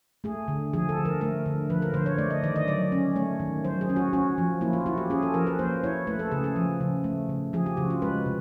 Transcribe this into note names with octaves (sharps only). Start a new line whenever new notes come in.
A3 G#4
D3
F3 G#4
A4
D3
A#4
A3 A#4
D3
F3 B4
A#4
D3 C5
C#5
A3 D5
D#5
D#3 D5
D#5
F#3 D5
C#4
A3 C#5
D#3
F#3 C5
G#4
C#4
F#4
C#4 F#4
F3
A#3 E4
F4
E4 F#4
G4
C#4 G#4
A4
F3 A#4
B4
A#3 C5
E4 C#5
A3 B4
A4
C#3 G#4
G#4
F3
C#3
A3
C#3
F3 G#4
G4
C#3 F#4
F4
G#3 B4
C3